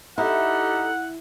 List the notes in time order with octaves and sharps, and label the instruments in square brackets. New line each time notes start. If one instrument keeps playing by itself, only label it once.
[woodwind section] D#4 G4 A4 [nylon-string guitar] E4 [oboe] F#5